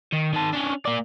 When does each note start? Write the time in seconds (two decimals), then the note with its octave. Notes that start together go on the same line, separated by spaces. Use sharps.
0.12 D#3
0.33 D#3 A5
0.53 C#4 D4
0.85 A#3 D5